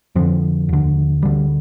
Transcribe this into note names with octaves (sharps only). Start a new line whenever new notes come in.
F2 D3 F3
D#2 D3
D2 D3 G3